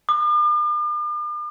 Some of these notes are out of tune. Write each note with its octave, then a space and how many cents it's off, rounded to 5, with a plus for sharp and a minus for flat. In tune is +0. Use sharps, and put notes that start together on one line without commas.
D6 +45